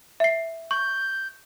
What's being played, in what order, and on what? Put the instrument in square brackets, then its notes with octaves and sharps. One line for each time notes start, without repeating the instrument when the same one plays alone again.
[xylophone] E5 C7
[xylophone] C#6 [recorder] G6